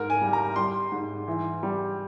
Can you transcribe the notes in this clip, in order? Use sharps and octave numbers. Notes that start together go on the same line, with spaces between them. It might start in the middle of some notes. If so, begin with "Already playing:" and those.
Already playing: G#2 A#4
G#5
G3
A#5
G3 C6
G#2
E3
G3